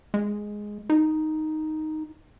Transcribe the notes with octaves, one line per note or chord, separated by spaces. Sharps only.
G#3
D#4